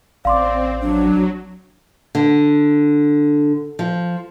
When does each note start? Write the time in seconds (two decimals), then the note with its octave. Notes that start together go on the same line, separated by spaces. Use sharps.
0.25 A1 C4 D5 F5 C6 D6
0.81 F#3 D4
2.15 D3
3.79 F3